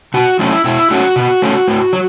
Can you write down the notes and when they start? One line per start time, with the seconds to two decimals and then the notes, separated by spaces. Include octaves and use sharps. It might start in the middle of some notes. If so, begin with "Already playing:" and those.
0.14 B2 F#4
0.39 F#3 A3 C#4 E4
0.65 B2 E4
0.91 A3 C#4 F#4
1.16 B2
1.42 A3 C#4
1.68 A2
1.93 F#3